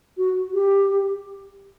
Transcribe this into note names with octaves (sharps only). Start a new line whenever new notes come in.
F#4
G4